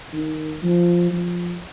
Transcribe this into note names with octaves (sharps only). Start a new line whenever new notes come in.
D#3
F3
F3